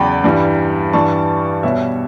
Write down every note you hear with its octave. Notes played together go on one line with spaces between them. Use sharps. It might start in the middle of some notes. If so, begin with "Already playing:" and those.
Already playing: E2 C#3 F#3 D5 G5 B5
G2 E3 G3
G2 E3 G3 A5 C#6
B2 G3 C#5 E5